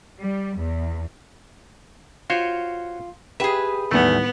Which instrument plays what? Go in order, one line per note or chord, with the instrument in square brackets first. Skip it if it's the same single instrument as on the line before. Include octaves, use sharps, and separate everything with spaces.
[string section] G3
E2
[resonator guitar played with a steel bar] F4 [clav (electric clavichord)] F#4 C5 C#5
[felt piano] G4 G5 [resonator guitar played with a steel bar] G#4 B4 [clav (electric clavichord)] E5
[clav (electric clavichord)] E2 A3 [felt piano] A2 D#3 G3 [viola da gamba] B3